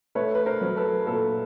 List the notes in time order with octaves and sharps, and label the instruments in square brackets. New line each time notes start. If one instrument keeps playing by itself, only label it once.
[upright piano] A3 B4 C#5
B4
A#4 C5
F#3
A4 B4
A#2 A4